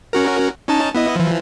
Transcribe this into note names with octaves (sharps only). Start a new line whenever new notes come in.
C#4 F#4 A#4
C#4 D#4 A5
B3 E4 D#5
E3 F3